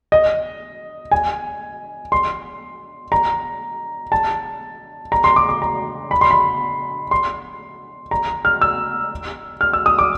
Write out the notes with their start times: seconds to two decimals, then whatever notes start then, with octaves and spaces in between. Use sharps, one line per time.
0.12 D#5
1.11 G#5
2.12 C6
3.12 A#5
4.12 A5
5.12 A#5
5.24 C6
5.36 D6
5.49 D6
5.62 A#5
6.11 B5
6.21 C6
6.31 B5
7.11 C6
8.11 A#5
8.45 F6
8.61 E6
9.61 F6
9.73 E6
9.86 D#6
9.99 D6